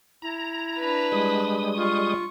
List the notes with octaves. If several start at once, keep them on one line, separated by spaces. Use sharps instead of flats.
E4 A#5
D4 B4
G3 G#3 D#6
F4 C#6